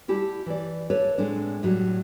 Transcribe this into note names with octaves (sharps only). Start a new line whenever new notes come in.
G3 E4 G4 A5
E3 D5
A4 B4 C#5 D5 E5
A2 G#3 C4 D4
A2 F#3 G3